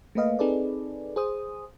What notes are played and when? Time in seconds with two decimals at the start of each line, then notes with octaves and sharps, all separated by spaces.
0.15 A3 A#3 B4 D#5 F5
0.39 C4 D#4 G#4 A4 B4 D5
1.16 G#4 C5 D#6